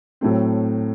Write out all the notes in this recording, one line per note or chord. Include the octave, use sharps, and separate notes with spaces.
A2 F#3 A3 C4